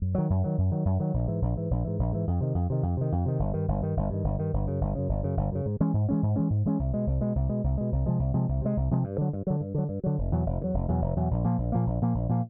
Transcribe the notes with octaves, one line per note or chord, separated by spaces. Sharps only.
F#2
D#3 F#3
F#2
D#3 F#3
F#2
D#3 F#3
F#2
D#3 F#3
A#1
G#2 E3
A#1
G#2 E3
A#1
G#2 E3
A#1
G#2 E3
F2
C3 D#3
F2
C3 D#3
F2
C3 D#3
F2
C3 D#3
G1
G2 D#3
G1
G2 D#3
G1
G2 D#3
G1
G2 D#3
G1
F#2 C#3
G1
F#2 C#3
G1
F#2 C#3
G1
F#2 C#3
G#2
E3 G#3 C#4
G#2
E3 G#3 C#4
G#2
E3 G#3 C#4
G#2
E3 G#3 C#4
C2
B2 G#3
C2
B2 G#3
C2
B2 G#3
C2
B2 G#3
C2
C3 F3 G#3
C2
C3 F3 G#3
C2
C3 F3 G#3
C2
C3 F3 G#3
G2
D3 F#3
G2
D3 F#3
G2
D3 F#3
G2
D3 F#3
F1
E2 B2 F#3
F1
E2 B2 F#3
F1
E2 B2 F#3
F1
E2 B2 F#3
A#1
A#2 F3 A#3
A#1
A#2 F3 A#3
A#1
A#2 F3 A#3
A#1
A#2 F3 A#3